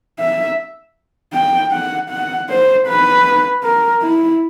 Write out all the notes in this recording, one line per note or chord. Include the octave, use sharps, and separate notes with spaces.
E5
G5
F#5
F#5
C5
B4
A#4
E4